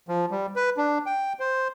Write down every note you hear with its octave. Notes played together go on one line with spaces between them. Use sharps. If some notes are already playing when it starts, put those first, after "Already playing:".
F3
G3
B4
D4
G5
C5